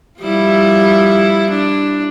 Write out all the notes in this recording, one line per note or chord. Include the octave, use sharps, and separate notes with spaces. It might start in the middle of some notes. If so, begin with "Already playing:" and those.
F3 G3 E4
D4